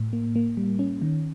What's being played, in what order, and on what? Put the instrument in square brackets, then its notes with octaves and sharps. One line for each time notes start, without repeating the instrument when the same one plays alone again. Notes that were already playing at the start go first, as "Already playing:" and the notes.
Already playing: [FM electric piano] A2
A#3
A#3
G3
C#4
D#3